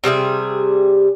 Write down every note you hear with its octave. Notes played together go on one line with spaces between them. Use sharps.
C3 G3 G#4 E5